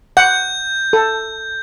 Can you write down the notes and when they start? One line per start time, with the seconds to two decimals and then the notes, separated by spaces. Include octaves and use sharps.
0.17 F#5 G6
0.93 A4